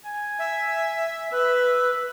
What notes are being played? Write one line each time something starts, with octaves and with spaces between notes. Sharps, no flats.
G#5
E5
B4 E5